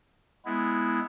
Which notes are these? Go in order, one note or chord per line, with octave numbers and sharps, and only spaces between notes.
G#3 B3 E4